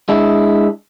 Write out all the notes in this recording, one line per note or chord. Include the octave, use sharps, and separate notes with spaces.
G#3 D4 E4